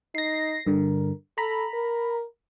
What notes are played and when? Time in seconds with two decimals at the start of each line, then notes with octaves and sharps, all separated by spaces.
0.15 D#4 A#6 C7
0.67 G2 D3 A#4
1.38 A4 A#5 B5
1.74 A#4